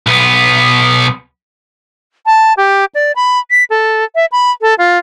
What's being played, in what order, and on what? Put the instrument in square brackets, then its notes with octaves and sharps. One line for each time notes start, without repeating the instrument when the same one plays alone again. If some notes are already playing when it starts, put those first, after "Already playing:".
[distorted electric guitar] B1 B3
[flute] A5
G4
D5
B5
B6
A4
E5
B5
A4
F4